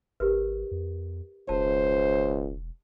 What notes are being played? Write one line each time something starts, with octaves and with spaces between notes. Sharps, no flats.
G#1 G4 A#4 B4
F2
E1 C#2 C5 A5